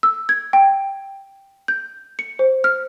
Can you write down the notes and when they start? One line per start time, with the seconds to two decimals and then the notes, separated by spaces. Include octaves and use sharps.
0.03 E6
0.29 G#6
0.53 G5
1.68 G6
2.19 C#7
2.39 C5
2.64 F6